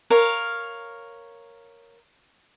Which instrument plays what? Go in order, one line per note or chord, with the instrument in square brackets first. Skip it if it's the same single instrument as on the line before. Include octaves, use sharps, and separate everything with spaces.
[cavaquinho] A#4 C#5 F5